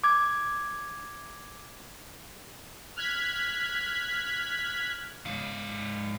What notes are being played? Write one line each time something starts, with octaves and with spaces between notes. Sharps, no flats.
D6 G#6
F6 F#6 G#6 B6
G#2 F5